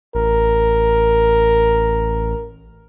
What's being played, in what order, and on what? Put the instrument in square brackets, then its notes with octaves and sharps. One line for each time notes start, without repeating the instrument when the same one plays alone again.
[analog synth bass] A1 [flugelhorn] A#4